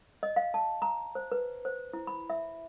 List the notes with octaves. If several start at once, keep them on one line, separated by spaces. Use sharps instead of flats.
D#5
F5
A5
A#5
C5
B4
C5
E4
B5
E5